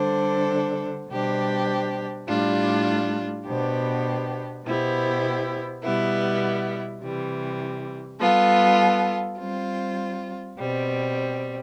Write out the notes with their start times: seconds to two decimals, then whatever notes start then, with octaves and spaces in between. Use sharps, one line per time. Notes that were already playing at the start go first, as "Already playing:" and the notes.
Already playing: D3 G3 D4 A4 C5
1.08 B2 G3 D4 G4 C5
2.27 A2 G3 D4 F4
3.45 B2 B3 D4 G4 C5
4.64 B2 B3 E4 G4 C5
5.83 B2 G3 B3 E4
7.01 C3 E3 G3
8.20 G3 B3 F4 A4
9.39 G3 C4 F4
10.57 B2 G3 C4